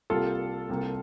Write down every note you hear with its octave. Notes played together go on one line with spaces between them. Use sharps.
C2 C3 G3 A#3 F4 A4
C2 C3 G3 A#3